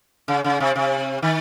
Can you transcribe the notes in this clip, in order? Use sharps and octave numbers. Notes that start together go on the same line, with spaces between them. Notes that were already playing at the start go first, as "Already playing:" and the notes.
C#3
C#3
C3
C3
D#3